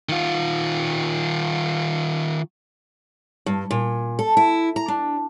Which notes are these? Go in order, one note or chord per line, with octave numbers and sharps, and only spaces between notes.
D#3 F4
G2
A#2
A4
E4
A#5
D4